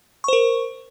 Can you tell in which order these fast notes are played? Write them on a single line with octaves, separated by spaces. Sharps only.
C#6 C5 A#4